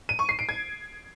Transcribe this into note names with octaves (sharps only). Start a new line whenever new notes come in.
D#7
C#6
C7
D7
G#6